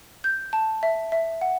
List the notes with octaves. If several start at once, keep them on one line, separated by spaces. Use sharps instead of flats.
G6
A5
E5
E5
F#5